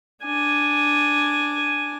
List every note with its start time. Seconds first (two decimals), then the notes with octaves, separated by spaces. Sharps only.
0.24 D4 G#5